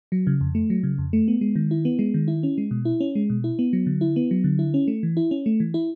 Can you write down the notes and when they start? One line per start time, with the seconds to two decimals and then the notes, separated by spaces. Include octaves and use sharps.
0.12 F#3
0.27 C#3
0.41 F2
0.55 A3
0.70 F#3
0.83 C#3
0.98 F2
1.13 A3
1.28 B3
1.41 G#3
1.56 D#3
1.71 E4
1.85 B3
1.99 G#3
2.14 D#3
2.28 E4
2.43 C#4
2.58 G#3
2.71 B2
2.85 E4
3.00 C#4
3.15 G#3
3.30 B2
3.44 E4
3.59 B3
3.73 F#3
3.86 D3
4.01 E4
4.16 B3
4.31 F#3
4.44 D3
4.59 E4
4.74 C#4
4.88 A3
5.03 E3
5.17 E4
5.31 C#4
5.46 A3
5.60 E3
5.74 E4